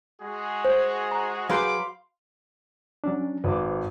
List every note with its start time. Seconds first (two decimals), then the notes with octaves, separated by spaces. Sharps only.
0.22 G#3 F#4 G#4
0.65 C5
1.11 A#5
1.50 F#3 G#4 B4 F5 B5 C6 D6 G6
3.04 F#3 C#4 D4
3.44 G#1 B4 C5 D6